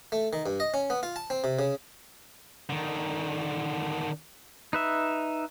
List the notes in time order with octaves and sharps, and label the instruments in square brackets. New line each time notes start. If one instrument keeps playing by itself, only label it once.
[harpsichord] A3
D#3
G2
D#5
C#4
B3
F4
A5
C4
C3
C#3
[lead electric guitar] D3 D#3
[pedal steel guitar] D#4 B4 E5